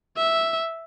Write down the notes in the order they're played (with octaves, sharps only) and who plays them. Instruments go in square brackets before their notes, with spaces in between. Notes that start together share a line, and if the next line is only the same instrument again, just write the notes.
[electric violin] E5